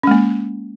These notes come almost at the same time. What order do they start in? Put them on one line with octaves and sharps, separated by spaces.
C#4 G#3 A#3